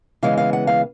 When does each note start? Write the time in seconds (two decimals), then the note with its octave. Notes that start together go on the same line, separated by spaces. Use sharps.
0.23 C#3 E3 G#3 B3 F5
0.38 F5
0.53 F#5
0.67 F5